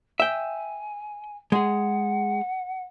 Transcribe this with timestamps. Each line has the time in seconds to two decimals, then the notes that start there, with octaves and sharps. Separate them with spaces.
0.20 E5 G5 G#5
1.52 G#3 G#4 F#5